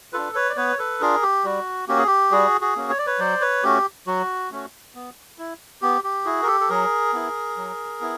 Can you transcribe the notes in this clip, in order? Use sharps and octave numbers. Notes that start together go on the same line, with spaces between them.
D4 F4 A4 B4
B4 C#5
D5
B3 B4 C#5
A4 B4
D4 F4 G#4 A#4
G4
G3 F#4
A#3 C#4 F#4 G4
G#4
G4
G3 F#4 G#4
F#4 G#4
A#3 C#4 F#4
C#5
D5
B4 C#5
F#3 C5 D5
B4 C#5
A3 C#4 F#4 G4
F#3 F#4
A3 C#4 F#4
B3
E4
B3 G4
G4
E4 F#4 G#4
A#4
G4 A4
A4
F#3 G#4 A#4
B3 E4
F#3
B3 E4